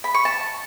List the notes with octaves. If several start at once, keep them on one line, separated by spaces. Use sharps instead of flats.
B5
C#6
A5